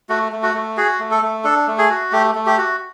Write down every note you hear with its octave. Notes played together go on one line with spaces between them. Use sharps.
A3 F#4
A3
F#4
A3
F#4 G#4
A3
A4
A3
D4 A4
A3
G#4
F#4
A3 G4
A3
G4
F#4